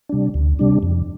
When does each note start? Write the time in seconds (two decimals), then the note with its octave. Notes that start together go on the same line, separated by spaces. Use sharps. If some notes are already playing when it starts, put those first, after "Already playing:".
0.09 C3 G3 D4
0.34 D2
0.59 C3 G3 D4
0.83 F2